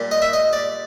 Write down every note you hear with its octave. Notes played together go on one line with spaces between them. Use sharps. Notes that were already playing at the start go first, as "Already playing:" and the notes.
Already playing: A#2 G3
D#5
E5
D#5
D5